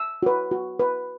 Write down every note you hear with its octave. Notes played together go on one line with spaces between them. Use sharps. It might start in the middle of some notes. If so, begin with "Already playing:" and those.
Already playing: E6
F#4 B4
F#4
B4